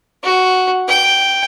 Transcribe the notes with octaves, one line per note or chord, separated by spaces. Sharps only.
F#4
G5